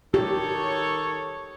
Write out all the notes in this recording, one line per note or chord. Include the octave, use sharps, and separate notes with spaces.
D#3 G4 A4 C#5